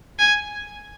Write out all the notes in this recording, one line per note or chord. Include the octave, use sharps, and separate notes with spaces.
G#5